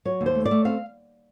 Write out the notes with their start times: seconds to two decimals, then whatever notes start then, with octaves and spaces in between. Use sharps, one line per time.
0.05 F#3 C#5
0.21 D#2
0.26 C5
0.35 A3
0.45 D5
0.51 A3
0.65 C4 F5